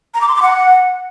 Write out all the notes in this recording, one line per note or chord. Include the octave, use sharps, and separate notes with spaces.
A#5
D6
C6
D6
F#5